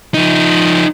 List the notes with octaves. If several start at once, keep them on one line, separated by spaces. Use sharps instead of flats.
F3 D#4